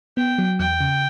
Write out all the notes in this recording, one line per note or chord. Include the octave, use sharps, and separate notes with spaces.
B3 G5
F#3
E2 G5
C#3